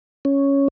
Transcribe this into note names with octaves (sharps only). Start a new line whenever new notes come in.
C#4